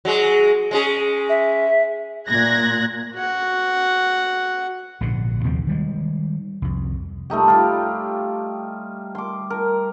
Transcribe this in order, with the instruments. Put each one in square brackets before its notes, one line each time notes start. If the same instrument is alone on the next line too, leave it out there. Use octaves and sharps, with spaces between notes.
[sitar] F#3 G#3
G#3 C#4 G#4
[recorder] E5
[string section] A#2 F#6 G#6 A#6
[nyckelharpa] F#4 F#5
[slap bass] A#1 G#2 B2 D3
D#2 C3 F3 C4
D#3 G3 G#3
C2 F2
[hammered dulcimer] G3 A3 D#4 G4
G3 F4
C6 D6
A#4